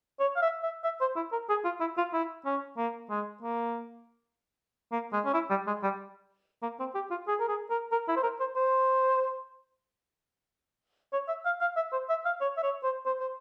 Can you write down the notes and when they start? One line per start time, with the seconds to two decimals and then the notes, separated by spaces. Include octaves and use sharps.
0.20 C#5
0.36 F5
0.42 E5
0.63 E5
0.84 E5
1.01 C5
1.16 E4
1.32 A#4
1.50 G#4
1.65 F4
1.81 E4
1.98 F4
2.13 E4
2.46 C#4
2.78 A#3
3.10 G#3
3.42 A#3
4.92 A#3
5.13 G#3
5.25 C#4
5.34 E4
5.50 G3
5.67 G#3
5.83 G3
6.63 A#3
6.80 C4
6.95 G4
7.11 F4
7.28 G#4
7.40 A#4
7.48 G#4
7.70 A#4
7.92 A#4
8.08 E4
8.16 C5
8.23 A#4
8.40 C5
8.56 C5
11.13 C#5
11.28 E5
11.45 F5
11.61 F5
11.76 E5
11.92 C5
12.10 E5
12.25 F5
12.41 C#5
12.58 E5
12.63 C#5
12.84 C5
13.06 C5
13.20 C5